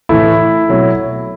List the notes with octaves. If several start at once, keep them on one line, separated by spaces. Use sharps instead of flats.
A2 E3 A3 E4
B2 F#3 A3